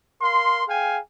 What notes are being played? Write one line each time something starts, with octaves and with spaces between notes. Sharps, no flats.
A#4 F5 C6
G#4 F5 G5 G#5